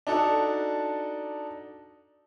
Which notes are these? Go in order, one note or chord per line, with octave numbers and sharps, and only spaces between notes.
D4 D#4 F#4 A4